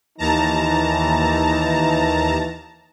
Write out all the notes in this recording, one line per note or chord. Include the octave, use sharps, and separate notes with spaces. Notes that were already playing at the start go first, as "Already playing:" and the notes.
D#2 E3 D#4 A5 A#5